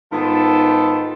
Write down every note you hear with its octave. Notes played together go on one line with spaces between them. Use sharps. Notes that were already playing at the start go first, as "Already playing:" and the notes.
G#2 D#3 B3 F4 A4 A5